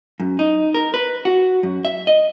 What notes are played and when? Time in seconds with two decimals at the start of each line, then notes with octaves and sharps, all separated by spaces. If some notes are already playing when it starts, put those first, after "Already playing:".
0.20 F#2
0.39 D#4
0.74 A#4
0.94 B4
1.25 F#4
1.63 F#2
1.85 E5
2.07 D#5